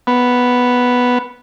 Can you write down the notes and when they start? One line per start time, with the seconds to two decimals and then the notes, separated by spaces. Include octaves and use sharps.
0.07 B3